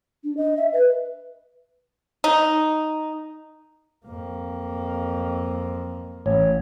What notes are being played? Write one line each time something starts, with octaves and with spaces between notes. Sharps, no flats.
D4
D#5
E5
B4
D#4
F2 A#3
A1 C#5